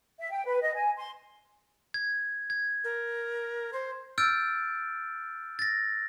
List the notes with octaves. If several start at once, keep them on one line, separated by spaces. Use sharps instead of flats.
E5
G5
B4
D#5
G#5
C6
G#6
G#6
A#4
C5
E6 F6 G6 A6 D7
A6 A#6